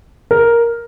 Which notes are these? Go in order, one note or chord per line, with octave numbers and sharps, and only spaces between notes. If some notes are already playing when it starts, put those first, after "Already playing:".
A#4